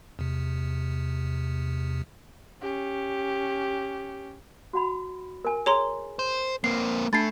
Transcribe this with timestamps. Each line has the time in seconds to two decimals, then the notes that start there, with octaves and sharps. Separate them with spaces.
0.19 E2 C3
2.62 C#4 G4
4.73 F#4 F#5 B5
5.45 A#4 G#5
5.66 G#4 C#5 G#5 A#5 C6
6.19 C5
6.64 A#3 C4 C7
7.13 A3 D4 A5 B5 A6 C7